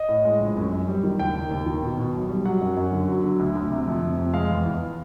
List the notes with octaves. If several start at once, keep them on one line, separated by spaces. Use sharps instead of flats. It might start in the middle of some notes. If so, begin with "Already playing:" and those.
Already playing: D#5
A2
G#3
A#1
F#2
F#2
G3
D#3
D#2 G5
D#2
D#2
D#3
B2
B2
B1
G3
F#3 F#5
F#2
F#2
D3
F#3
D3
D2
D2
C3
F2
C3
F2
G#3 F5
E2
E2